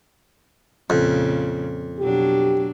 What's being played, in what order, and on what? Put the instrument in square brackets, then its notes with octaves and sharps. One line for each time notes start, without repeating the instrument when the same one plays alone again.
[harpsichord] F2 [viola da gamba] A#2 C#3
[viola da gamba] B2 F#3 D4 [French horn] G4